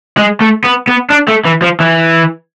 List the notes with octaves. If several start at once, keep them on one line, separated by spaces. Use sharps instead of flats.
G#3
A3
B3
B3
D4
A3
E3
F3
E3